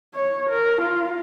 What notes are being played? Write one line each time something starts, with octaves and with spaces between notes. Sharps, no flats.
C#5
A#4
F4